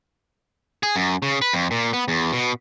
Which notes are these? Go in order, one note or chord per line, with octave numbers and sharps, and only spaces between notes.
G#4
F#2
C#3
B4
F2
A#2
B3
E2
B2